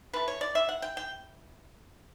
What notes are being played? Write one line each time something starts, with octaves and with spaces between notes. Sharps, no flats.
E3 A3 B4
C#5
D5
E5
F#5
G5
G5